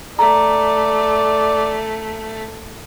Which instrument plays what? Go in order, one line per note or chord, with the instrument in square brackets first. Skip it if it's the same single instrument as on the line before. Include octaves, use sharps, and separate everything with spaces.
[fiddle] A3 [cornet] D5 [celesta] A#5